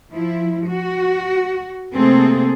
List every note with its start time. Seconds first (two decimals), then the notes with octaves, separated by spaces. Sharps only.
0.12 F3 E4
0.67 F#4
1.92 C3 A3 A#3 C4 G#4 A4